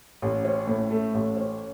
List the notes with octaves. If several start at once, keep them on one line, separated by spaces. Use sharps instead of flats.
A1
C#4
A2
A3
A1
C#4